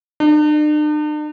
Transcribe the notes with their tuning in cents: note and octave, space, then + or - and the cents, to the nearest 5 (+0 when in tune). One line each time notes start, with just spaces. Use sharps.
D4 +45